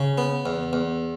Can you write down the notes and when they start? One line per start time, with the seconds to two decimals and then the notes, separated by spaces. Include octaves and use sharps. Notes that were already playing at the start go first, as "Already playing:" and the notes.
Already playing: C#3
0.18 B3
0.46 E2
0.73 E2